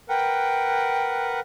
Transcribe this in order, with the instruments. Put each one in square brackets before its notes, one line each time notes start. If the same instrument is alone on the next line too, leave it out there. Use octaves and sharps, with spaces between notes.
[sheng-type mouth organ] A#4 B4 F#5 [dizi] G5